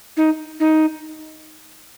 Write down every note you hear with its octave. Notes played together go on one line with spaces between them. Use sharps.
D#4
D#4